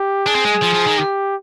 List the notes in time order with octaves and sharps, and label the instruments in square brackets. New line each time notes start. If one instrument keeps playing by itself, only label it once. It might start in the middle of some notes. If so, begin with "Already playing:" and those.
Already playing: [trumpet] G4
[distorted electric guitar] D4 [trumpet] G#4
[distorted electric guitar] C4
G#3
F3
F3
D#3
[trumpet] G4